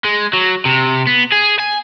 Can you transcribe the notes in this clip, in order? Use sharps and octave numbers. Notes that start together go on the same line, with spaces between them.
G#3
F#3
C3
B3
G#4
G#5